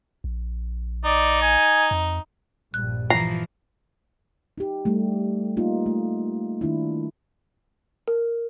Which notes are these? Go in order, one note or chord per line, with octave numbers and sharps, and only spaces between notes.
A#1
D#4 D5
G#5
F2
A#1 G2 G3 F#6
E3 F3 A#5 C7
D#4 G4
G3 A3
A#3 D#4 F4
A3
D#3 D4 E4
A#4